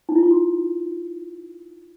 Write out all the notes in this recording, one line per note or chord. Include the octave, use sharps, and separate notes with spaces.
D#4
E4
F4
F#4